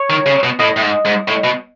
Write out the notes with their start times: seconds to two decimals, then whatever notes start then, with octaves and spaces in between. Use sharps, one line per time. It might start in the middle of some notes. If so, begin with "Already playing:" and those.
Already playing: C#5
0.10 D#3
0.26 C#3
0.43 B2
0.59 A2 D#5
0.76 A2
0.82 G#2
1.05 G#2
1.28 A2
1.44 B2